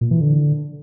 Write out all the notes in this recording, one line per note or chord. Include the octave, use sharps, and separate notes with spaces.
A#2
E3
D3